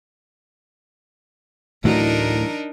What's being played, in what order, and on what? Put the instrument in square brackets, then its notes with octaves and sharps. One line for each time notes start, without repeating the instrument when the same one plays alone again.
[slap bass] D2 A2 A3 [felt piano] E3 F#3 [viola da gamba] D4 D#4 A#4